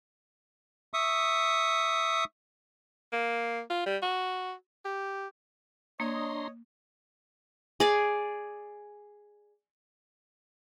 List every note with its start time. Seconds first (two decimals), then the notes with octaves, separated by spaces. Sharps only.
0.94 E5 C#6 D#6
3.12 A#3
3.70 F4
3.86 G3
4.02 F#4
4.85 G4
6.00 A#3 D4 C#5 D#5 A#5 C6
7.80 G#4 D5